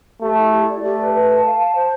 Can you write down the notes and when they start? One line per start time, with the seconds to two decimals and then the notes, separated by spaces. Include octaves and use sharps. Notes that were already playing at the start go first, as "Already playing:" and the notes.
0.21 A3 G4
0.37 E4
0.52 G4
0.68 D5
0.83 A3 G4
0.98 B4
1.13 B4
1.29 A5
1.44 F5
1.60 A5
1.75 C5